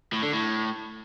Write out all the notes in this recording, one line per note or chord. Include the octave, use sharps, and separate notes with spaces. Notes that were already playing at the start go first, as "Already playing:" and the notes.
A2
D3
A2